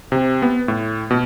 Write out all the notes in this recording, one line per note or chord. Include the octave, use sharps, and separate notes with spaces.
C3
B3
A2
B2